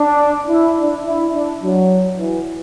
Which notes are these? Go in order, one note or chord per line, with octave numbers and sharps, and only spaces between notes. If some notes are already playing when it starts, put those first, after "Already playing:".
Already playing: D4
E4
D4
E4
D4
F#3
E3